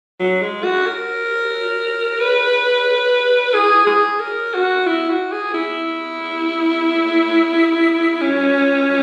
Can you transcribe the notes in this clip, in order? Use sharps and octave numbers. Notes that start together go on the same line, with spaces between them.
F#3
G#3
F#4
A#4
B4
G#4
G#4
A#4
F#4
E4
F#4
G#4
E4
C#4